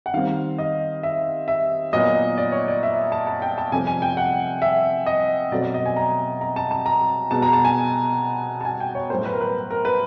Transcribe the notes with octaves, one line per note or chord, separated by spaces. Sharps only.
F#5
D#3 G3 C4 F5
D#5
E5
E5
A#2 F#3 B3 D#5
D5
C#5
D5
E5
A5
A5
G5
A5
C3 F3 A3 C4 G#5
G#5
G5
F#5
E5
D#5
B2 F#3 A3 C4 D5
D5
D#5
G#5
A#5
A#5
A5
A5
A#5
B2 G#3 B3 A5
A#5
A5
G#5
A5
G#5
G5
C#5
A2 F#3 A3 C5
B4
A#4
B4
A#4
B4